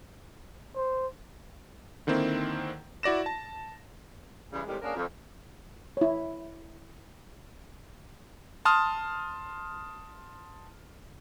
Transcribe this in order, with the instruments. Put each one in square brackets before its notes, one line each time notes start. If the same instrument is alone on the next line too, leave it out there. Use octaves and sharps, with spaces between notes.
[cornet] C5
[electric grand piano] D3 D#3 A#3 C4 E4
E4 F#4 D5 A#6 E7
A5
[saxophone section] C#3 E3 G3 G#3
A2 C3 D#3 G3 G#3
A#3 C#4 D4 G#4 A#4
F2
[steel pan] E4 C#5
[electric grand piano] A5 C6 D#6 F6